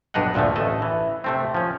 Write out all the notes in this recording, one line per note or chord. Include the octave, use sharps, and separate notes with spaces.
B1 G2 D4 D#4 D#5 F#5
D2 A#2 D3 F3 A3
A1 A3 A4 D#5
E3
C3 A3 C4
F3 C#4